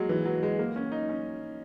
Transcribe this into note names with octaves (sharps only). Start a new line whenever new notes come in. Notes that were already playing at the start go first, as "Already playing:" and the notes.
Already playing: F#3 G#3 A#3
E3
F#3
G#3
A#3
C#4
D#4
C#4